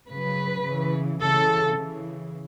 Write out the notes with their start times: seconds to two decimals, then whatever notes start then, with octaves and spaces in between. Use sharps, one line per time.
0.09 C#3 F#3 B4
0.64 C#3 E3
1.20 C#3 E3 A4
1.76 C#3 E3